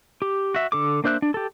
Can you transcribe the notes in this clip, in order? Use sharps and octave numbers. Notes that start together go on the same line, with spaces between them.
G4
F#4 E5
D3 A4 D6
A#3 D4 C5 E5 F#6
D4
G4 A4